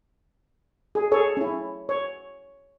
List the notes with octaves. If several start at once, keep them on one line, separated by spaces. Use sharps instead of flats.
G#4
G#4 A4 C#5
C#4 E4
C#5